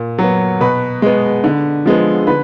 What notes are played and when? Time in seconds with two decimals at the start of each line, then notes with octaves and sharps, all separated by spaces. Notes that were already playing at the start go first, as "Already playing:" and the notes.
Already playing: A#2
0.19 F#3
0.24 B3
0.60 B2 B4
1.02 G#3 B3
1.44 D3
1.86 F3 G#3 B3
2.27 D3 B4